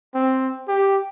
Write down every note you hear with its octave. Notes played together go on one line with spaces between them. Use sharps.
C4
G4